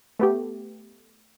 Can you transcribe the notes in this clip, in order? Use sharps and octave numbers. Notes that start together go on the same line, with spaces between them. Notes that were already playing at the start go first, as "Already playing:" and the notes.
A3 B3 G4